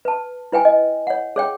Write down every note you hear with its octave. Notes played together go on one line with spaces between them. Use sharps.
B4 A5
E4 B4 G5 G#5
D#5
C#5 F#5
G#4 C#5 G5